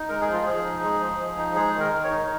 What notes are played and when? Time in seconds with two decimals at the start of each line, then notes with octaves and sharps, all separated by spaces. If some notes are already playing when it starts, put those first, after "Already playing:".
Already playing: D#4
0.09 G#3 A#4
0.21 G#4
0.28 F3
0.33 F4
0.45 F3 G#4
0.64 D#4
0.83 G#3
1.00 F3
1.19 F3
1.37 D#4
1.55 G#3 G#4
1.74 D#3
1.80 A#4
1.92 D#3
2.04 C#5
2.11 D#4